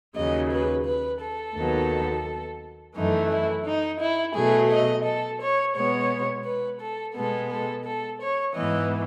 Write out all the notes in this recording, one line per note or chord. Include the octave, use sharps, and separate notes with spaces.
D#2 C#3 F#3 D#5
B4
B4
A4
D#2 D#3 F#3 B3
F#2 E3 A3 D#4
E4
D#4
E4
B2 F#3 A3 G#4
D#5
A4
C#5
B2 G#3 B3 C#5
B4
A4
B2 G#3 B3 A4
A4
A4
C#5
G#2 E3 B3 D#5